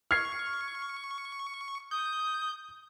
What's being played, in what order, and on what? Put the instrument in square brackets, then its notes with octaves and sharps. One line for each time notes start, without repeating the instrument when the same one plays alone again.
[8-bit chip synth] C#6 [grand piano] F6 G#6 C7
[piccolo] D#6 [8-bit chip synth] G6